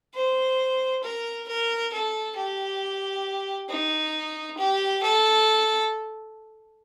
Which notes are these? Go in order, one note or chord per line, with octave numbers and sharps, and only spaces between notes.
C5
A#4
A#4
A4
G4
D#4
G4
A4